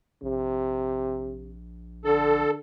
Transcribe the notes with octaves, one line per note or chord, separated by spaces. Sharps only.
A#1 C3
D3 A4